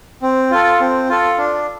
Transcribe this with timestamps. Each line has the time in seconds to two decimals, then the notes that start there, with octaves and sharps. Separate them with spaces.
0.22 C4
0.51 F4 A4
0.79 C4
1.09 F4 A4
1.38 D4